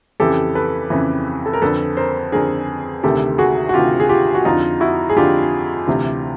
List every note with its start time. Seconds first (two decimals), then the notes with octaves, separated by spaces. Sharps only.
0.20 F2 C#3 E3 G4 A4
0.55 A4 B4
0.90 F2 C#3 E3
1.46 A4
1.53 A#4
1.62 F2 D3 A4 B4
1.97 A#4 C5
2.32 F2 D3 G#4 A#4
3.03 D2 C3 D#3 G4 A4
3.38 F#4 G#4
3.69 F#4
3.74 D2 C3 D#3 F4 G4
4.00 G#4
4.09 F4 G4
4.35 F#4
4.45 F2 D3 D#4 F4
4.80 E4 F#4
5.09 G#4
5.16 F2 D3 F4 G4
5.87 D2 C3 E3